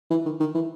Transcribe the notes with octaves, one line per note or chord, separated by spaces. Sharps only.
E3
D#3
D#3
E3